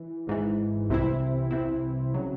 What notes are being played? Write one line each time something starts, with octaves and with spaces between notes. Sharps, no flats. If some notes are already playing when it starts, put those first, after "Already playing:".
Already playing: E3
G#1 G#2 E3
C2 C3 E3 C4 E4
C2 C3 E3 C4 E4
C#3 F#3